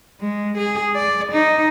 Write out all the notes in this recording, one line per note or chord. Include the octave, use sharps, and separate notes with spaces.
G#3
G#4
D5
D#4